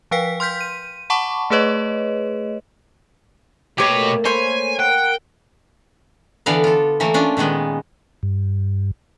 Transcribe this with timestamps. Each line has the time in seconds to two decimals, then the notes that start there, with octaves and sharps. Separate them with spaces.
0.11 F3 B4 F5 G5 B6
0.40 C6 F6 G6 B6
0.61 D#7
1.10 F#5 A5 B5 C#6 D6
1.50 A3 G#4 B4 C#5 D#5
3.78 B2 A3 A#3 G4 B4 C#5
4.25 C5 C#5 G#5 B5
4.80 A#4 F#5 G5
6.46 D3 E3 B3 E4 D5 F5
6.64 F4 A4
7.00 E3 F#3 A3 A#3
7.14 C#4 D4 F4
7.37 A#2 D#3 G#3 B3
8.23 G2